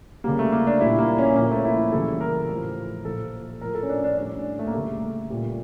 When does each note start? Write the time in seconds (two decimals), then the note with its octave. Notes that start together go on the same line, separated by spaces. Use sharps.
0.24 C#3 G3 A#3
0.39 A3
0.52 A#3
0.67 D4
0.80 A#2 G3 E4
0.99 A#3
1.18 C#4
1.36 A#2 F3 A#3
1.51 A3
1.65 E4
1.92 C#3 E3 G3 A4
2.21 A#4
2.48 A2 F3
3.04 A#2 F3 A4
3.61 A2 F3 A#4
3.75 A4
3.83 C#4
3.89 D4
4.04 D4
4.17 A2 G3 D4
4.31 C#4
4.59 A3
4.67 A#3
4.74 C#3 G3 A3
5.30 A#2 G3